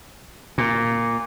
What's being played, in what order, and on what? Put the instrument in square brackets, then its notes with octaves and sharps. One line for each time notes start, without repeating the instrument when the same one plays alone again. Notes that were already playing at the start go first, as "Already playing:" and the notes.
[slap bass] A#2